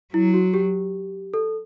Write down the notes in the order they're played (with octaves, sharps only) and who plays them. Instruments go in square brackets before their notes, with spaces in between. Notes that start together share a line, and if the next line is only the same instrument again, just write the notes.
[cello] F#3 [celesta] E4
[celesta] F#4
G4
A4